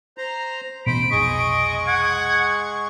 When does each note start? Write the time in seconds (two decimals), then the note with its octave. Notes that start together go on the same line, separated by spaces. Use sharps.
0.18 C5 A#5
0.86 D#1 A1 B2 C5 B5 D7
1.11 F1 B1 G#3 D#5 C#6
1.87 F#5 G#6